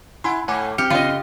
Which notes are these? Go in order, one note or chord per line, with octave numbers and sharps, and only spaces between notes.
E4 F#5 G#5 C6
A2 A3 F#5 G#5 D6
C4 G4 F6 C#7
C#3 F4 D#5